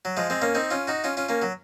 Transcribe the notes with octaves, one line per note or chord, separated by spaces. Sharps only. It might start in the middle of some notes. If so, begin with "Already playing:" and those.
F#3
F3 G#3
G#3 C4
A#3 C#4
C4 D#4
C#4 F4
D#4 F#4
C#4 F4
C#4 F4
A#3 C#4
F#3